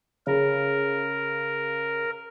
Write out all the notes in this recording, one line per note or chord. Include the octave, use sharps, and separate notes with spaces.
C#3 A#4